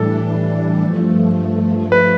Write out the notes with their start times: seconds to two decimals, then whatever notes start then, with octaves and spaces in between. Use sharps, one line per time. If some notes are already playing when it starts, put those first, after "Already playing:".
Already playing: A2 E3 G3 D4 A4
0.81 G2 F3 A3
1.92 B4